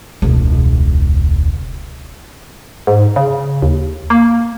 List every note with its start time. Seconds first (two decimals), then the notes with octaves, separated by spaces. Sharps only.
0.22 E1 C#2
2.87 G#2
3.16 C#3
3.62 D#2
4.10 A#3